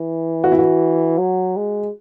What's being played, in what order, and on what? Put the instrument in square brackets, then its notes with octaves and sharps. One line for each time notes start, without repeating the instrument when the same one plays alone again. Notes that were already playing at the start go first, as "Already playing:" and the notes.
Already playing: [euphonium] E3
[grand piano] F#4
E4
F#4
[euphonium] F#3
G#3